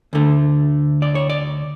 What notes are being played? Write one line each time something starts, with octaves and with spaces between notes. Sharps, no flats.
D2 D3 A3
D5
C#5
D5